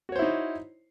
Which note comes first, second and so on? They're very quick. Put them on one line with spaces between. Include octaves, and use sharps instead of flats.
F#4 C#5 C5 E4 D#4